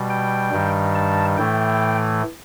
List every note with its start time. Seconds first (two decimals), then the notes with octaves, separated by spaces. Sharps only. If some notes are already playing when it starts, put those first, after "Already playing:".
Already playing: B2 G3
0.10 G5
0.51 G2 D#3 G3
0.95 A5
1.37 A2 E3 A3 G5